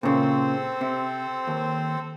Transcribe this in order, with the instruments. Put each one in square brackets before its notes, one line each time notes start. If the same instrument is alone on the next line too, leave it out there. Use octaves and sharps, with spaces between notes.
[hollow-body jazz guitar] A#2 C#3 [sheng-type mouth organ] C4 A4 C5
[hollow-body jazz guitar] C3
D#2